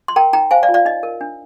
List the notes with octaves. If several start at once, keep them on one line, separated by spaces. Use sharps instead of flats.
C6
A#4 G5 A#5
D#4 G5 A#5
C5 F5 G#5
D5 F5
F4
D5 F5
D#4 D#5
A#4
D4